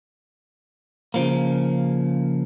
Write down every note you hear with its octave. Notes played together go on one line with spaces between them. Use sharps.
C#3 F3 A#3